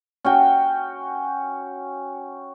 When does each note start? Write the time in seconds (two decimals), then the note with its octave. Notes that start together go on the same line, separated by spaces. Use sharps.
0.24 C#4 F#4 G5